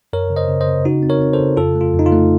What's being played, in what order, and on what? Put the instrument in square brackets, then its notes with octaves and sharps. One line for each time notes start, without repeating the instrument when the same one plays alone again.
[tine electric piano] F#2 A#4 C#5
C#3
C5 D#5
C#3
C5 D#5
C#3
C#3 D#4 F#4
C4
A#4 C#5
C4
A4 C5
C#3
F2 F4 A4
A3
F4
F2
D#4
F4
A3